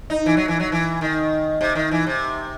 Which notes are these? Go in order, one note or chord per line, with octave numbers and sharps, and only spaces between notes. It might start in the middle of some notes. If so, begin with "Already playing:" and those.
D#4
E3
F#3
E3
F#3
E3
D#3
C3
D#3
E3
C3